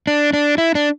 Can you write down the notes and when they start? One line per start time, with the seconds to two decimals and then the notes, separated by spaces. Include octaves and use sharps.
0.07 D4
0.33 D4
0.58 E4
0.75 D4